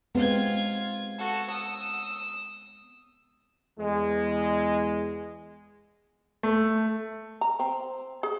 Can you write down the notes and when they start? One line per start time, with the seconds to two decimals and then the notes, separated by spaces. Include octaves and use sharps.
0.15 G#3 B3 C4 F4 G#6
1.18 F#4 A4
1.50 D#6 E6
3.79 E2 G#3
6.43 A3
7.41 A#5
7.59 C4
8.23 G#4